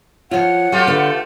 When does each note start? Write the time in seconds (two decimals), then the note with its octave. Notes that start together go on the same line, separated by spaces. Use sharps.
0.31 F3 F4 C#5 F#5
0.72 F#3 A3 F4 G4
0.87 D3 B4